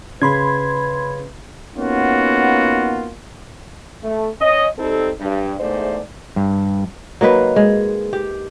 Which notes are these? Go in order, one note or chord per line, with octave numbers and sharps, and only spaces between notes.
C#3 B4 B5 C6 G#6
A#3 B3 C#4 D#4 F4 F#4
A3
C#4 D#5
G3 C4 D#4 A4
G2
E2 G#2 A3 C5 D5
G2
F#3 A#3 D#4 B4
G#3
G4